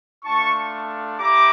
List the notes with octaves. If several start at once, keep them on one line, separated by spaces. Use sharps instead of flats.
A3 D4 F4 A5 C#6
E4 G4 A#5 D6